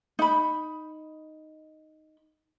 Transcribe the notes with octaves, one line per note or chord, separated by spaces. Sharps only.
D#4 B5